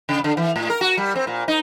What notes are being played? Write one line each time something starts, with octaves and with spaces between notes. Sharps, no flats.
C#3
D3
E3
A2
A#4
F#4
G3
C4
A#2
D#4